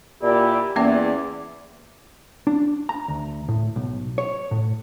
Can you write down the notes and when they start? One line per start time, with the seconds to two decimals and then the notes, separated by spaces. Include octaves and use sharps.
0.22 A#2 E4 G4 D5
0.76 E2 A#3 C#4 D5 E5
2.47 D4
2.89 A#5
3.08 D2
3.48 A2
3.76 B1
4.18 C#5
4.51 A2